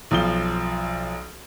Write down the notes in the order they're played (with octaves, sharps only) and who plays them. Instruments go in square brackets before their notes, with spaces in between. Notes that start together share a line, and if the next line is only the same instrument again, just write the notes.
[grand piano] B1 F3 G7